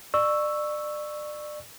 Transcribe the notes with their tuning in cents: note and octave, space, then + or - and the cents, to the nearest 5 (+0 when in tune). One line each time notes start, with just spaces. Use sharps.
D5 +30 C#6 +0 E6 +0